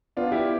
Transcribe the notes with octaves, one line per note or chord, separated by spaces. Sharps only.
B3 D4 F4
E4 G4